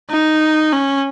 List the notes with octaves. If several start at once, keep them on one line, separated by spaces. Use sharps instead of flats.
D#4
C#4